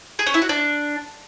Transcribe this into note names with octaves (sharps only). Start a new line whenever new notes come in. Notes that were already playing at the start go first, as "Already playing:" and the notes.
G#4
C#4
E4
F#4
D4